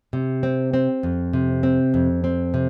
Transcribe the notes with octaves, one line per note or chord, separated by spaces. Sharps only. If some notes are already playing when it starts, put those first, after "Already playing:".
C3
C4
C4
F2
C3
C4
F2
C4
C3